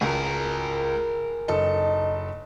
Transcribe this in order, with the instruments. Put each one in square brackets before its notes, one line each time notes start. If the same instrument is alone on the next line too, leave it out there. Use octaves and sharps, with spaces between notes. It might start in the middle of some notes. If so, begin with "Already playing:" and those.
[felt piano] C#2 [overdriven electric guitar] G#4 A#4
[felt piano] F#1 A4 A5 [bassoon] D#4